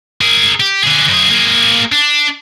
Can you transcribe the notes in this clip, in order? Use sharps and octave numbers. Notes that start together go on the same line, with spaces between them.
G#4 A#4
G4
D3 G#4
F#2 G#4
A#3 G#4
D4